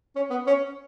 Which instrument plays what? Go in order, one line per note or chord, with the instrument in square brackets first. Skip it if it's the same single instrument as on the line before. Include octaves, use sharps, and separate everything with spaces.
[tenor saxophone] C#4
B3
C#4